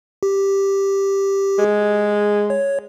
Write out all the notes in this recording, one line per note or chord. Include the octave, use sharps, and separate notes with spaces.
G4
G#3
C#5